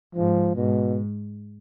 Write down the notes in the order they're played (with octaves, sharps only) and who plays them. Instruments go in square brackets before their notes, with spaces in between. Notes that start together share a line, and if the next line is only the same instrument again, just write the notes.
[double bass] G#2 [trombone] F3
[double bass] G#2 [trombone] B2